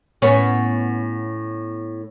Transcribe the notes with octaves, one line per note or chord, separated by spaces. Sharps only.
A2 B3 C#4